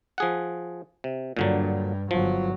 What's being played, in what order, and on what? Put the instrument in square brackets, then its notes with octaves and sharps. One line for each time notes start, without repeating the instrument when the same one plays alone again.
[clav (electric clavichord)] F3 G#4 F#5
C3
[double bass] G2 [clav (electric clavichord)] A#2 D3 F#3
[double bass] G1 F#3 [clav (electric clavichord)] F3